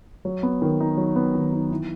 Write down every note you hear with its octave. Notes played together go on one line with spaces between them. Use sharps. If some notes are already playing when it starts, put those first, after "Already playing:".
F#3
B3
D#3
D#4
F#3
B3
D#3
D#4
E3